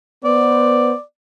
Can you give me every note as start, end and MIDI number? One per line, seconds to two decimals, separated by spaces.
0.25 0.93 59
0.25 0.93 72
0.25 1.02 74